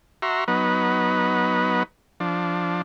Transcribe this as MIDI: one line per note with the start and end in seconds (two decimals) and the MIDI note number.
0.22 0.44 66
0.22 0.44 76
0.22 0.44 82
0.22 0.44 84
0.48 1.83 54
0.48 1.83 59
0.48 1.83 63
0.48 1.83 71
2.20 2.82 53
2.20 2.82 62